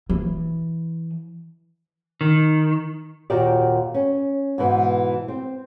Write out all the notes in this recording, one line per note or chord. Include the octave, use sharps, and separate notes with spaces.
E3
D#3
D#2 A#2 F#4 G4 D5
C#4
G#2 B2 E3
C4